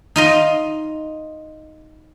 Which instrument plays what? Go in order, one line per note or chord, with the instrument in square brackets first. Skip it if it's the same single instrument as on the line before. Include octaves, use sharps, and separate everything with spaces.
[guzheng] D#4 F4 D#5